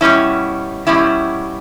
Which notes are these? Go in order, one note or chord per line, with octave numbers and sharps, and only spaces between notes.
B2 G3 C#4 E4
B2 G3 C#4 E4